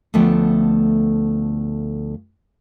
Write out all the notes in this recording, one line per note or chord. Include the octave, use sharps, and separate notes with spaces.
D2 F3 A3 B3 G5